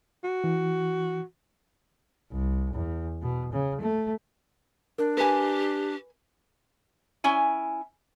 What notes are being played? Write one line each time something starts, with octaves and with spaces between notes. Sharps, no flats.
F#4
E3
C2
E2
B2
C#3
A3
D4 A#4
G4 B4 G#5
C#4 E4 G#5